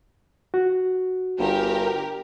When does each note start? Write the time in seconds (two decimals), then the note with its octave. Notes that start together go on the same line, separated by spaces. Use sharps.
0.54 F#4
1.39 G1 G4 A#4